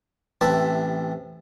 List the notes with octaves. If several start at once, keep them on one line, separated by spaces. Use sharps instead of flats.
A1 C3 E3 E4 B4 A5